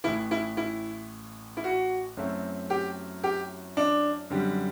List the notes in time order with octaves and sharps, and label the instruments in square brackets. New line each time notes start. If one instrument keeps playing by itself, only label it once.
[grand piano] A1 A2 E3 [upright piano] E4
[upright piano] E4
E4
E4
F#4
[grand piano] F#2 F#3 A3 C4 E4
[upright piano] G4
G4
D4
[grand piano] F#2 D3 G3 C4 G4